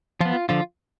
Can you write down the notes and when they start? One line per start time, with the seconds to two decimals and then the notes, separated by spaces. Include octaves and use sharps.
0.21 F3 B3 F4
0.49 D3 F3 F4